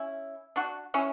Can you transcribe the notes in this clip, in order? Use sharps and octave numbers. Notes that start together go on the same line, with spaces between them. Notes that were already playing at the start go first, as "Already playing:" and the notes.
Already playing: C#4 E4
D4 F#4
C#4 E4